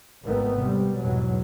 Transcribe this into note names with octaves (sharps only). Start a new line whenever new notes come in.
G#1 D#3 A3 B3
C3 G3
E2 G#2 B2 F#3